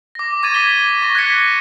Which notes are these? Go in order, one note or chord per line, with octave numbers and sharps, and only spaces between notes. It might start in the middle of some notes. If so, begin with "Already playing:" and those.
D6 A#6
C#6 D6 G#6 A6 D#7
G#6 B6 G7
C#6 A#6
F#6 G#6 B6 C#7